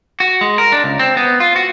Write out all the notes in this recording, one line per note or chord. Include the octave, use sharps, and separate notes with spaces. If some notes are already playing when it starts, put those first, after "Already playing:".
F#4
G#3
A#4
D4
C#2
C4
B3
F4
F#4